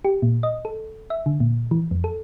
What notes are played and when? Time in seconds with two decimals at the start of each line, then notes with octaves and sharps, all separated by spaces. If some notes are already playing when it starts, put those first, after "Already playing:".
0.05 G4
0.22 A#2
0.43 D#5
0.65 A4
1.10 E5
1.26 D3
1.40 A#2
1.71 E3
1.91 F2
2.04 A4